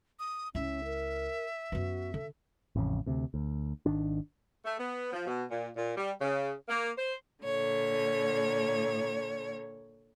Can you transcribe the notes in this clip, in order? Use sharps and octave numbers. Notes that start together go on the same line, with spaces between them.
D#6
C#2 C#4 E4 E5
A#4
F#2 B3 F#4
D3 A4
A1 F2 C#3
D2 C3
D2
G#1 D#3 D4
A3
B3
F3
B2
A#2
A#2
G3
C#3
A#3
C5
A#2 D3 C#5